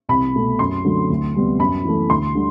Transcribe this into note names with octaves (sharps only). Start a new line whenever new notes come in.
C2 B5
B2 A3 C4
F#2 C6
D3 F#3 A3
D2
C3 G3 B3
F#2 B5
E3 A3
D2 C6
D3 G3